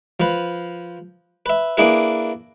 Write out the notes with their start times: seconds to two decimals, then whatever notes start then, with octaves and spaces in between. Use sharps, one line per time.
0.20 F3 B4
1.46 B4 E5
1.77 A#3 D4 E4 G#4 B4